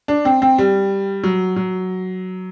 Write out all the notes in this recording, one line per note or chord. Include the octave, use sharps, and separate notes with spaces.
D4
C4
C4
G3
F#3
F#3